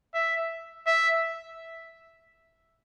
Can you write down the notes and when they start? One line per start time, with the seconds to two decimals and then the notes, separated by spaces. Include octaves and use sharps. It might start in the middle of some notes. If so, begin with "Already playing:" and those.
0.14 E5
0.86 E5